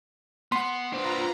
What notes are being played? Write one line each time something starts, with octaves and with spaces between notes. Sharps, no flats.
B3 F#5 C6
D4 F4 B4 C5 A#5